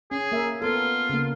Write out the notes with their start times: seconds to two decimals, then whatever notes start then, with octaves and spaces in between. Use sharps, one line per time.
0.11 C#4 G#4
0.32 A#3 A#4 E5
0.62 B3 F4 A4
1.10 C#3 A#3